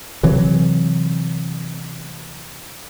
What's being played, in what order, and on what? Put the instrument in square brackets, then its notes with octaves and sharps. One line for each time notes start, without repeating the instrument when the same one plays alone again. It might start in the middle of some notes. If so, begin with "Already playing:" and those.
[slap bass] C3 E3 F#3